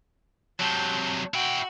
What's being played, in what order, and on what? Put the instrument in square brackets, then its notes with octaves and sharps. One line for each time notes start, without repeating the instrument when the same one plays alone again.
[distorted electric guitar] C3 F#3 [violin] A5 G6
[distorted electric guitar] E4 G5 [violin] F#4